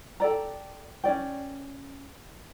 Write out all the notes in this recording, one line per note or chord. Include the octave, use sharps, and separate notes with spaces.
G4 A4 D5 A#5
C#4 D#4 D5 G5